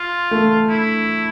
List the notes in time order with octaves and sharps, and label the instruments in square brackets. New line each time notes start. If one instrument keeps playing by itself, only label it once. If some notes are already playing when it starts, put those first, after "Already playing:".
Already playing: [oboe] F4
[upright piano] A3
[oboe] E4